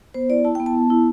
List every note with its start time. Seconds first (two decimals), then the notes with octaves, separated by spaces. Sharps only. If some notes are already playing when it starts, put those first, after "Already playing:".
0.14 B3 C5
0.29 E4 D5
0.45 E4 A5
0.55 B3 G5
0.66 A5
0.75 B3
0.90 E4